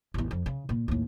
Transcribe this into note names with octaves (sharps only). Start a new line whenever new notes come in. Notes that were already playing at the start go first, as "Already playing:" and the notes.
A1 E2
F2
C#3
A#2
D#2 A2